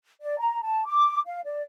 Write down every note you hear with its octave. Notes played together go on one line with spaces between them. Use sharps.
D5
A#5
A5
D6
F5
D5